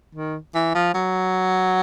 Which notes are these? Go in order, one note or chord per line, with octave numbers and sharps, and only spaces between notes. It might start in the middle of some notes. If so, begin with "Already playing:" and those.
D#3
E3
F3
F#3